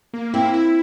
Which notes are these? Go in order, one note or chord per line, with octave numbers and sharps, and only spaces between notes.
A#3
C4 E4
E4